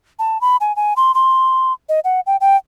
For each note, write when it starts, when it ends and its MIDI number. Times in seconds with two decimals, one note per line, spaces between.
0.19 0.40 81
0.41 0.57 83
0.61 0.75 80
0.76 0.94 80
0.97 1.14 84
1.15 1.73 84
1.89 2.00 75
2.04 2.20 78
2.26 2.36 79
2.41 2.57 79